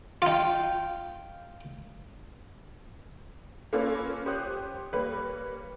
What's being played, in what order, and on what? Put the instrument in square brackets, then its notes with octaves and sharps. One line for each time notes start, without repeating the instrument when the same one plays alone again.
[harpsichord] D#4 F4 [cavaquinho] F5 G5
[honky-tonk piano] A#3 C#4 F4 A4 B4 C#5
G4 C5 C#5 D#6 F#6 G6
G3 A#3 B4 C#5